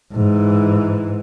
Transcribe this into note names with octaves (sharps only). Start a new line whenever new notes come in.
G#2 E3